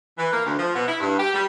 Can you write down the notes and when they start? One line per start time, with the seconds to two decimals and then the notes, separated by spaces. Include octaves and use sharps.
0.18 E3
0.31 A#3
0.45 D2
0.58 F3
0.74 B2
0.87 E4
1.00 G2
1.18 G4
1.34 G3